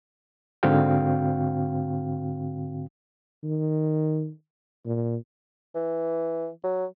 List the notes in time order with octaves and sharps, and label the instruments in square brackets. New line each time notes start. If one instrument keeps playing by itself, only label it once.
[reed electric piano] G#2 D3 C4 F#4 F5 G5
[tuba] D#3
A#2
[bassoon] E3
F#3